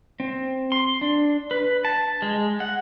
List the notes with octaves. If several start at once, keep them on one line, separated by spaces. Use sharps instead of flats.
C4
C6
D4
B4
A5
G#3
F#5